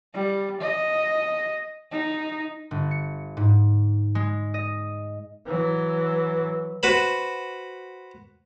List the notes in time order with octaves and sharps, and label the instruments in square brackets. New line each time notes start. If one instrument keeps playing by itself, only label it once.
[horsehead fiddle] G3
D#5
D#4
[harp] G1
C#7
G#2
G#3
D#5
[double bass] E3 F#3
[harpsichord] F#4 B4 C5 B5